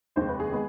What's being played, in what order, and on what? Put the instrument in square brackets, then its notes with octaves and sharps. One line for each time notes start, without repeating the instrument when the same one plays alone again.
[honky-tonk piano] F1 D#2 D#3 G#3 C5
B4
G#4
G#3 B3